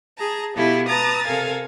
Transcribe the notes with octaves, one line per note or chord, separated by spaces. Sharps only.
G#4 A5 A#5
B2 B3 E4 F4 G4 A4
B4 A5 A#5 D#6 A6
C3 A4 A#4 F5 G#5